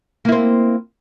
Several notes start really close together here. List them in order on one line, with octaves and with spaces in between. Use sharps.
A#3 E4 C4